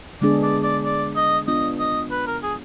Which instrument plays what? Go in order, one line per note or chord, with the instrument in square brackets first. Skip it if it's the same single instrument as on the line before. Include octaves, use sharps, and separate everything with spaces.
[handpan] D3 G#3 B3 D4 G#4 [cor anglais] D5
[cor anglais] D5
D5
D5
D#5
[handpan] B3 D4 F4 [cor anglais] D#5
[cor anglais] D#5
B4
A#4
G#4